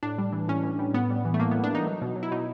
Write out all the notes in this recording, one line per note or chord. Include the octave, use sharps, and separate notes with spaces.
A2 D4
G3
E3
A2 C#4
A2
G3
A2 B3
G3
E3
A3
A2 A#3
B3
A2
D4
G3 D#4
F#3
B2
F#3
E4
B2 D#4